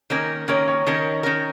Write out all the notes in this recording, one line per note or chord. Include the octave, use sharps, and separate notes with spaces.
D#3 A#3 C#4 A#4
D#3 A#3 C#4 A#4 C#5
C#5
D#3 C#4 A#4
D#3 C#4 A#4